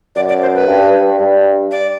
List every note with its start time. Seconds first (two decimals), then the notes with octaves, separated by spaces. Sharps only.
0.16 F#2 D5
0.29 D5
0.42 C5
0.55 B4
0.67 G2
1.19 G2
1.71 D5